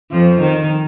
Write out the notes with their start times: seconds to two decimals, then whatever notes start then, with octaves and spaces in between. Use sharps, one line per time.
0.11 F2 F3
0.41 D#3